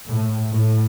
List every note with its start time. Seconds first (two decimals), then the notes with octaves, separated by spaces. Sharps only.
0.08 A2
0.53 A2